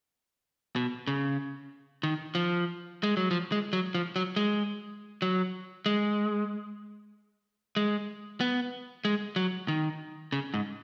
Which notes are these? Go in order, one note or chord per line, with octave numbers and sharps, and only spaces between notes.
B2
C#3
D#3
F3
G#3
F#3
F3
G#3
F#3
F3
F#3
G#3
F#3
G#3
G#3
B3
G#3
F#3
D#3
C#3
G#2